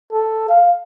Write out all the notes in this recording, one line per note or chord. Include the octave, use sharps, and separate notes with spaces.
A4
F5